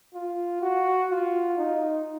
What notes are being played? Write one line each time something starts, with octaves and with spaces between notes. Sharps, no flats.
F4
F#4
F4
D#4